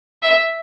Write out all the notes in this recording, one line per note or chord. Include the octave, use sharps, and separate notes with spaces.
E5